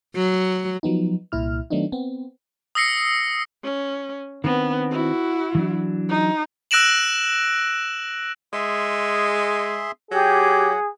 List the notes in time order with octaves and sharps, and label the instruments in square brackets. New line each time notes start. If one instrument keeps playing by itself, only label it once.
[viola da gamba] F#3
[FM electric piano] F3 F#3 B3 D#4
C2 A#2 E4 F6
D#3 F#3 A3 B3 D4 D#4
B3 C4
[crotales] D#6 E6 A#6 C7 C#7
[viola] C#4
[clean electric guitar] D#3 C4 D4 [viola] B3
[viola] E4 F#4
[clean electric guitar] E3 F#3 D4
[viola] D#4
[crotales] E6 F#6 A#6 D7 E7 F#7
[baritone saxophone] G#3 [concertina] G#4 E5 C6
[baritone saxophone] F#3 [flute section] G4 [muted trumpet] G#4 [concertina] F#5